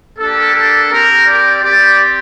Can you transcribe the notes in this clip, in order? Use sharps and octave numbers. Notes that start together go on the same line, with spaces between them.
A#3 D4 G4 A4
A4
C4 G4 A#4
D5
C4 G4 D5